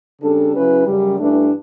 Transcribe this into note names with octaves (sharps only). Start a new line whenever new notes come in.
C#3 G3 D4 A4
C#3 F#3 C#4 E4 B4
F#2 C#3 G3
G2 E3 A3 D4